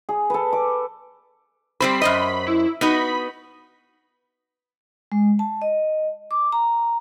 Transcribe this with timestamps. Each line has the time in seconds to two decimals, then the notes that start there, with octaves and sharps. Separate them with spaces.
0.09 G#4
0.30 A4 B4
0.53 D6
1.80 G3 C4 C5 B5
2.02 F#2 C5 D#5
2.47 E4
2.81 B3 D#4 F#4 B5
5.12 G#3
5.39 A5
5.62 D#5
6.31 D6
6.52 A#5